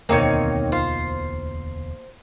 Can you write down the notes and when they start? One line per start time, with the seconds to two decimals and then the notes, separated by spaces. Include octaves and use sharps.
0.09 E1 D2 B2 D#3 A#3 C4 D#4 C#5
0.72 F4 C5